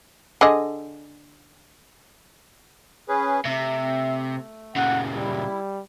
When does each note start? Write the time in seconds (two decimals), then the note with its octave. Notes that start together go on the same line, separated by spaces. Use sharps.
0.41 D3 G#4 D#5
3.09 C#4 G#4 B4
3.45 C3 A3 E5
4.76 A#2 C#3 F#5
5.16 G3 E4